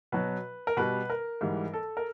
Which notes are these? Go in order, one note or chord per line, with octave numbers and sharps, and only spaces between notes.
B2 F#3 B4
A#4
B2 G3 B4
A#4
G#2 E3 G3
A4
A#4